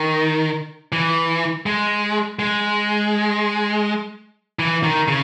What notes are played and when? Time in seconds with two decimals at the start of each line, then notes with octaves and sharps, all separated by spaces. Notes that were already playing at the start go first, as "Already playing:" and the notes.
Already playing: D#3
0.92 E3
1.66 G#3
2.39 G#3
4.59 E3
4.84 D#3
5.08 C#3